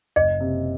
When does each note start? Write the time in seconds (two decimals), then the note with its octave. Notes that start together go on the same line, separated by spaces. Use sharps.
0.16 F#1 D#5
0.40 C3